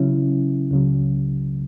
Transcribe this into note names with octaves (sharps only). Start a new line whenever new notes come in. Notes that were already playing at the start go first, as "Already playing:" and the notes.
Already playing: C#3 F#3 C#4 E4
C#2 C#3 F#3